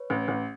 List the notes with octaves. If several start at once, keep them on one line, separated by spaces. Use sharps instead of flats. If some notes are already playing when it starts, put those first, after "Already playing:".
Already playing: B4 C#5
A1
A1